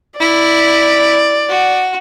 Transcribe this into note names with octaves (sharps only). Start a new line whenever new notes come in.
E4 D5
F#4